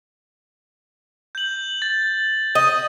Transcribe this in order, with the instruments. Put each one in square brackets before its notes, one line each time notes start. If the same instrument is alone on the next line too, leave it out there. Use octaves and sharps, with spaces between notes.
[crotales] G6 F#7
A6
[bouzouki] D#5